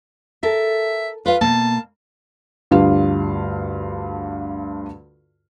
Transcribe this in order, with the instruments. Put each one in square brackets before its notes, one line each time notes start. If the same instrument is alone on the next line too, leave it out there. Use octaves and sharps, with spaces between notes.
[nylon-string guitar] A4 A#4 [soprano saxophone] E5
[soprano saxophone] F4 [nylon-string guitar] B4 F5
[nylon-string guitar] B2 A#3 [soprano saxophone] A5
[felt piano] D2 G2 G3 F4 F5